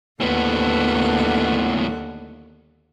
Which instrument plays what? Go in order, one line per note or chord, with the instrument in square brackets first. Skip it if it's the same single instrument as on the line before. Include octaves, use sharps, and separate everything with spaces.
[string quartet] D#2 D3 F#5 [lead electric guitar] A2 B3